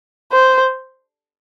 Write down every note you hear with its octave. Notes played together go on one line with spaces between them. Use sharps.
C5